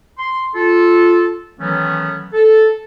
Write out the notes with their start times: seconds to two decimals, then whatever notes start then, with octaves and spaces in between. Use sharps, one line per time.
0.18 C6
0.55 F4 A4
1.59 D#3 E3 F#3 A3 B3 C#4
2.33 A4